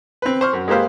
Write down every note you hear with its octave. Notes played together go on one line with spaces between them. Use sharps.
C4 B4
C5 C#6 F6
F#2
G#3 A#3 G4 B4 C5 F5